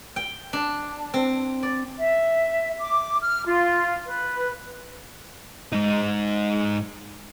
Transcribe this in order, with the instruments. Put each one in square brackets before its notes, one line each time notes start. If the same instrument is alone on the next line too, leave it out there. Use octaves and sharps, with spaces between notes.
[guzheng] G5
D4
C4
D5
[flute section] E5
D6
F6
F4
B4
[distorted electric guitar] G#2 D#4